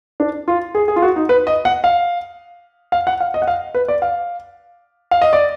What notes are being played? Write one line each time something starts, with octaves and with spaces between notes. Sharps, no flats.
D4
F4
G#4
G#4
F4
F#4
D#4
B4
D#5
F#5
F5
F5
F#5
F5
D#5
F#5
F5
B4
D5
F5
F5
D#5
D5